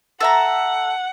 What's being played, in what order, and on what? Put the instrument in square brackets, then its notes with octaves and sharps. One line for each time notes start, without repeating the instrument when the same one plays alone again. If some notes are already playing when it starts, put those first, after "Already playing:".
[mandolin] A4 E5 A#5 [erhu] F#5